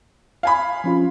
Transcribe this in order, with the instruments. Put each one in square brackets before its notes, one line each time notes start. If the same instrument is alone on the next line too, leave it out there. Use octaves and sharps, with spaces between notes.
[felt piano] F5 G#5 B5
[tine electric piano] F3 C#4 F4